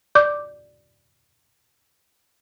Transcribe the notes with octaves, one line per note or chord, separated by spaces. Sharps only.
D5 D6 G6